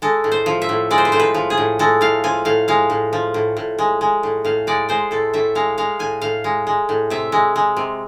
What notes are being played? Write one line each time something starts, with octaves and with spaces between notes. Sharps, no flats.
G#3 A4
A2
C5
F3
E5
A2
G#3 D5
C5
B4
A2 C5
B4
F3
G#4
A2
G#3 A4
A2 F5
F3 G#5
A2 F5
G#3 F5
A2
F3
A2
A2
G#3
G#3
A2
A2 F5
G#3 D5
G#3 C5
A2 A4
A2 E5
G#3 F5
G#3 F5
A2 G#5
A2 F5
G#3
G#3
A2
C3 E5
G#3
G#3
C3